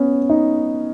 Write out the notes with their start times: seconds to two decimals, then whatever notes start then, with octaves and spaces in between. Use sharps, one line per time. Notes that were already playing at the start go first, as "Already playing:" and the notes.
Already playing: B3 C#4
0.30 D#4